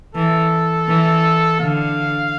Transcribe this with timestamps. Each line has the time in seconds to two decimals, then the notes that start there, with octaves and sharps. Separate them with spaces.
0.15 E3 A4
0.88 E3
1.60 D3 F5